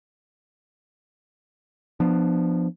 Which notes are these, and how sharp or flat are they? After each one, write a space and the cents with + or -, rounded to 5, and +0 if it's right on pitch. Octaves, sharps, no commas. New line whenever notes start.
F3 +0 B3 +0 D4 +20